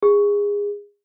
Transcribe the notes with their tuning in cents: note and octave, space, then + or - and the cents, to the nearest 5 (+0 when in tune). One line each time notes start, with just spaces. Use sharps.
G#4 -25